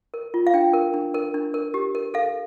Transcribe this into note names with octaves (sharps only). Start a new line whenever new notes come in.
A#4
F4
F5
D4 G5
A#4
D4
A#4
D4
A#4
G4
A#4
A4 F5